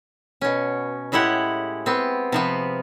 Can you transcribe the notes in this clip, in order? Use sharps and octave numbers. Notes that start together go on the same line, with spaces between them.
B2 C#4
A2 G#3 E4 G4 F#5
B3 C4
C3 F3 B3